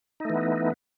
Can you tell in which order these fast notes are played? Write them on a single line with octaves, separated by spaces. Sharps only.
D#4 A3 E3 B3